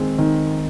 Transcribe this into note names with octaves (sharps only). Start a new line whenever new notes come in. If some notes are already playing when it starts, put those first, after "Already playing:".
Already playing: D#3 G#3 C4
D#3